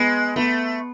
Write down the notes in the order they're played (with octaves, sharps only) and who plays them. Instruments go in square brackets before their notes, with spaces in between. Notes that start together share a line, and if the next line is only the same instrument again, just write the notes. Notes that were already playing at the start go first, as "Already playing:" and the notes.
Already playing: [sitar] G#3 [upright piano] B3
[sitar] A3 [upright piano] B3